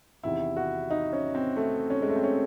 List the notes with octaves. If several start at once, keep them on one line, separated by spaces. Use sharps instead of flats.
E2 C3 D#3 E4
F#4
D#4
C#4
C4
A3
C#4
G#3
A3
C4
C#4